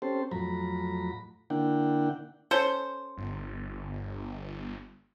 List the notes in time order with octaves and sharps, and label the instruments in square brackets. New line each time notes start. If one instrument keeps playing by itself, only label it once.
[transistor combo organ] C4 C#4 G4 A4 C5
F2 A2 F#3 A#5 B5
D3 A#3 D4 E4 F#5 G5
[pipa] C#4 A4 C5
[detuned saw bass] G1